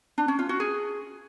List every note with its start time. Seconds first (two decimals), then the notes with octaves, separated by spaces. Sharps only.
0.18 D4
0.28 C#4
0.39 F4
0.49 F#4
0.60 G#4